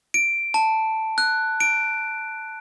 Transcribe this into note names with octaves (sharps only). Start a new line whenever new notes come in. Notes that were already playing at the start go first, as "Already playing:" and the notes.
D7
A5
F#6
D7